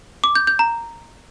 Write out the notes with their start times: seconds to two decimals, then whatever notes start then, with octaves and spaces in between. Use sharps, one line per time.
0.24 D6
0.35 G6
0.47 G6
0.59 A#5